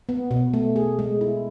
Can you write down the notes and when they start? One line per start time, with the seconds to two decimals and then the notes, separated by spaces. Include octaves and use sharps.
0.09 B3
0.31 B2
0.54 A3
0.76 G#4
0.99 G#3
1.21 E4